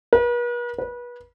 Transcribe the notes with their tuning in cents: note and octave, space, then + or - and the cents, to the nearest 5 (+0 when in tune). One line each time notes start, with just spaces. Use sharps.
B4 -45
B4 -30